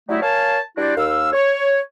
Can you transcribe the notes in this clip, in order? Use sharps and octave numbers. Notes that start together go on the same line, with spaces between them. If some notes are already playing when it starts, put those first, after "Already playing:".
F#3 G3 A3 D#4 E4
A#4 C#5 F5 G#5 A5
G3 D4 E4 F#4 C5 D5
D#2 F5 E6
C#5